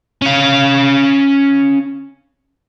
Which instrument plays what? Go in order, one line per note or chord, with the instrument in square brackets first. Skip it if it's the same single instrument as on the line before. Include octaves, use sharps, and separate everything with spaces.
[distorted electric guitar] C#4 F5